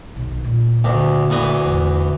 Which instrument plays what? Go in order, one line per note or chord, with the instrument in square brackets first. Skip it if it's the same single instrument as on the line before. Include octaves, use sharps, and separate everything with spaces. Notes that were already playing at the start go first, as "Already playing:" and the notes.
[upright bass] B1 D#3
A#2
[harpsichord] D2
D2 E3 D#6
[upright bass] E2 A2